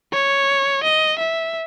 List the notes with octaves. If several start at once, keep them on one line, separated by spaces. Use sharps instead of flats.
C#5
D#5
E5